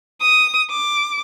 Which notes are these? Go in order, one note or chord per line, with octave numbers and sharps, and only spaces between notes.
D#6
D6